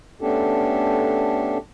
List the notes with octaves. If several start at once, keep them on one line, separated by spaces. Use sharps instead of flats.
A3 B3 C#4 D4 G4 A4